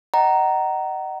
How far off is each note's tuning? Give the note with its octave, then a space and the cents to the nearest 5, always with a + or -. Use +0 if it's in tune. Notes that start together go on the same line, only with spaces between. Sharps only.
D#5 -15 F#5 +35 A#5 +0